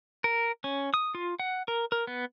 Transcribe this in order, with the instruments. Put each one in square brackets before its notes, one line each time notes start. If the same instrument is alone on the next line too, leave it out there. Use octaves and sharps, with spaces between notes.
[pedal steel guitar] A#4
C#4
D#6
F4
F#5
A#4
A#4
B3